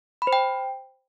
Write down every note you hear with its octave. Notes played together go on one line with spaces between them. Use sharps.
B5
C5
G5